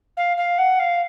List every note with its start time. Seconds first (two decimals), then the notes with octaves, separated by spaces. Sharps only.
0.17 F5
0.37 F5
0.58 F#5
0.79 F5